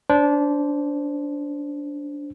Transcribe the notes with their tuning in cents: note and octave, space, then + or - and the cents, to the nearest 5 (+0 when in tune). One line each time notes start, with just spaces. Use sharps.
D4 -20 C5 +0